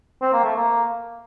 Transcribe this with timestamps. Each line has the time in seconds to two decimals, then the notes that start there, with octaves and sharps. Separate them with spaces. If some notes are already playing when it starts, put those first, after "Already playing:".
0.22 C4
0.33 A#3
0.44 A3
0.56 A#3